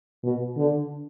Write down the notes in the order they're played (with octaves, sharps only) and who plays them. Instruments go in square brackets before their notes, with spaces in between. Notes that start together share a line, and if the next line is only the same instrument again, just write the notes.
[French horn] B2
D3